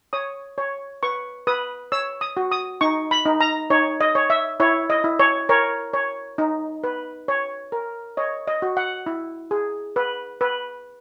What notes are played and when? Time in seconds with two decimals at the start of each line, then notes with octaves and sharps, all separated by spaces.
0.13 C#5 D#6
0.58 C#5
1.03 B4 C#6
1.47 B4 D#6
1.92 C#5 E6
2.21 D#6
2.37 F#4
2.52 D#6
2.81 D#4 C#6
3.11 B5
3.26 D#4
3.40 A#5
3.70 D#4 C#5
4.01 D#5
4.15 C#5
4.30 E5
4.60 E4 C#5
4.90 D#5
5.04 E4
5.19 C#5
5.49 A#4 C#5
5.94 C#5
6.38 D#4
6.84 B4
7.28 C#5
7.72 A#4
8.17 C#5 D#5
8.48 D#5
8.62 F#4
8.77 F#5
9.06 E4
9.51 G#4
9.96 B4
10.41 B4